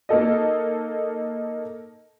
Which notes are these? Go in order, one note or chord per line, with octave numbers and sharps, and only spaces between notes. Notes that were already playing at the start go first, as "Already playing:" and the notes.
A#3 D#4 A4 D#5